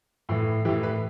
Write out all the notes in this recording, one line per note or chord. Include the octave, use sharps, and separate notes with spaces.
A2 E3
A2 E3 G4
B4